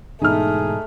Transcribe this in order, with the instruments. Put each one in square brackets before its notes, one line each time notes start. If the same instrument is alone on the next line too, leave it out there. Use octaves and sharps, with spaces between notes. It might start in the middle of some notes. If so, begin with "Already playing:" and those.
[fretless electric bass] G#2 B2 E3 [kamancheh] A3 [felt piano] D#4 F6 [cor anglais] G#4